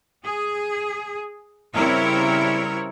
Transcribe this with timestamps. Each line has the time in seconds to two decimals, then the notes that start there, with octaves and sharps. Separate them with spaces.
0.23 G#4
1.74 C#3 G3 C4 E4 A#4 C#5